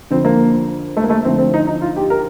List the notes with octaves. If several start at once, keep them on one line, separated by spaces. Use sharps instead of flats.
F2 D3 F3 C4
A#3
A3
A#3
A3
F2 D3 F3 C4
C4
D#4
D#4
F4
G4
A#4